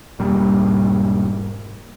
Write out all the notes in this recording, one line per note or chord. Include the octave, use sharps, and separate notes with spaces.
E1 G#2 G3 A#3